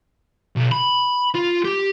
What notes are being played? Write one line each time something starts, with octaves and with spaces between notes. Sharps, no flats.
B1
B5
F4
G4